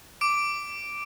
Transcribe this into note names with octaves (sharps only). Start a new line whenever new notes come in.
D6 D7